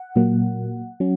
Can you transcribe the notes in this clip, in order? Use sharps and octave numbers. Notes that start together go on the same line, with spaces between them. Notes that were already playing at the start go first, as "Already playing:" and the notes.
Already playing: F#5
A#2 F#3 A#3
F#3 C#4